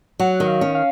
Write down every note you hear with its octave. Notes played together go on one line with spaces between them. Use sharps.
F#3 F#5
D#3
F5
C#4
F5